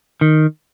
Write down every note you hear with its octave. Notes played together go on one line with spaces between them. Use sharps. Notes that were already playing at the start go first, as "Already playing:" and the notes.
D#3